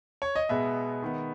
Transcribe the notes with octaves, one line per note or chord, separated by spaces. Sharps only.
C#5
D#5
B2 G#3 B3 E5
D#3 G#3 B3